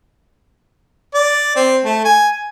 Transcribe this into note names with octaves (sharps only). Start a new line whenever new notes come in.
D5
C4
A3
G#5